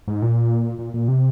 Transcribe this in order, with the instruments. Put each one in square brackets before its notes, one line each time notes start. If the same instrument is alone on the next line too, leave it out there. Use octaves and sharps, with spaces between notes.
[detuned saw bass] G#2
A#2
A#2
A#2
C3